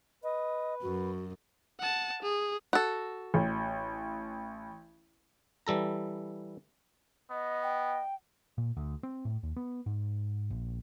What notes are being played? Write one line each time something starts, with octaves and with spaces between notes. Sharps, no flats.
B4 D#5
F#2 F#4
F#5 A5
G#4
F#4 A4
A1
E3 G3 A4 A#5
B3 D#5
G5
A#2
D2
C4
A2
D#2
B3
G#2
A#1